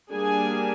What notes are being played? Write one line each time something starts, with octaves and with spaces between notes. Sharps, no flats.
G3 A#3 D4 G#4 G#5